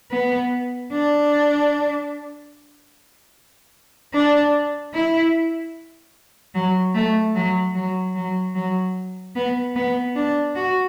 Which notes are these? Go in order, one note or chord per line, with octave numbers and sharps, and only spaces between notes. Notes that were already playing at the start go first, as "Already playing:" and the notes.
B3
D4
D4
E4
F#3
A3
F#3
F#3
F#3
F#3
B3
B3
D4
F#4